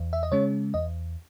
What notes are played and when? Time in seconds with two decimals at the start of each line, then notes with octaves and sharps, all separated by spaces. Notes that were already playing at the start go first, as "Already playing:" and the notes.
Already playing: E2
0.13 E5
0.23 D#5
0.32 C#3 G#3 C#4 C#5
0.74 E2 D#5